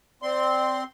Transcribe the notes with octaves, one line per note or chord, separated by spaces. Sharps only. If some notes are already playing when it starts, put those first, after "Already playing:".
C4 D5 C6